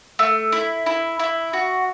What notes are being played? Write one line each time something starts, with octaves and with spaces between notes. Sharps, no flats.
A3
E4
E4
E4
F#4